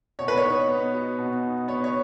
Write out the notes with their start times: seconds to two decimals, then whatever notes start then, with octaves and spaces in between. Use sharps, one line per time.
0.19 B2 C#5
0.28 B4
0.37 C#5
0.44 D#4
0.68 B3
0.94 F#4
1.19 B2
1.43 D#4
1.68 B3 C#5
1.84 C#5